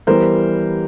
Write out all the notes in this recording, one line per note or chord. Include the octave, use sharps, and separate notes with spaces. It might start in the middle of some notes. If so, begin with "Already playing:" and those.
E3 G3 B3 A#4 C5